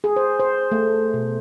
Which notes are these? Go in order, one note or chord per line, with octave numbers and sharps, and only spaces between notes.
G#4
C5
C5
A3
B2